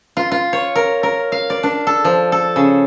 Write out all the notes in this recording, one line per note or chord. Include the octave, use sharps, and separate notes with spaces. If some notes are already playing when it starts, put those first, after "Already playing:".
F4
F4
C#5
A#4
A#4
F5
D5
D4
A4
F3
A4
C#3